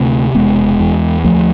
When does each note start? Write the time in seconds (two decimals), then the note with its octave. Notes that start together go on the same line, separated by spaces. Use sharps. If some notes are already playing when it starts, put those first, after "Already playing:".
Already playing: D2 C3 A3 C4
0.35 E1 G#3 B3
0.80 E2
1.25 D2 F3 A3